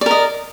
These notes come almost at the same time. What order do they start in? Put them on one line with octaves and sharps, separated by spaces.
D5 A#4 D#5